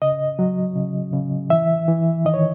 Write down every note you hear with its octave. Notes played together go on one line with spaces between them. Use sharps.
C#3 D#5
F#3
C#3
C#3
E3 E5
E3
D#3 D#5
C#5